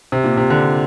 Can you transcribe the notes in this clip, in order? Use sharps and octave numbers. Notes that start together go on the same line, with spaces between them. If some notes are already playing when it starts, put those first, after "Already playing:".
C3
A#2
C3
D3